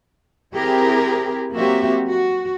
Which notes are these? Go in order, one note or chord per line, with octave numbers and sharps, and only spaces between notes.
C4 E4 G4 G#4 A#4
F#3 A#3 C4 F#4 G4 E5
F#4